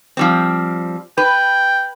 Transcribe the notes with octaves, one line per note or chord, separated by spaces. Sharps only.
F3 G3 C4
B4 G5